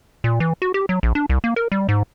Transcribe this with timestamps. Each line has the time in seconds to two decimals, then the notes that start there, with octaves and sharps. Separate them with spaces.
0.24 A#2
0.40 E3
0.62 F#4
0.74 G4
0.89 F#3
1.03 A#1
1.15 D4
1.30 C2
1.44 A#3
1.56 A#4
1.72 G3
1.89 G#2